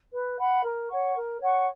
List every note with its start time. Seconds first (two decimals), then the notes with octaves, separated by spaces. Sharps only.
0.11 B4
0.37 F#5 B5
0.63 A#4
0.89 C#5 F#5 C#6
1.14 A#4
1.40 C#5 F#5 C#6